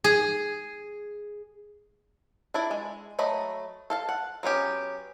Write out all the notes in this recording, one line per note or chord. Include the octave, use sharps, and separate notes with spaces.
G#4
D4 E4 D5
G#3
F#3 A3 D#5 B5
A4 F5 A5
F#5
F#3 B3 C#4 G4